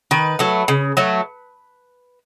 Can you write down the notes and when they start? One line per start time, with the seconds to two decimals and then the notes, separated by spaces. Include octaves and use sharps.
0.11 D#3 B4
0.39 F#3 A3
0.68 C#3
0.97 F#3 A3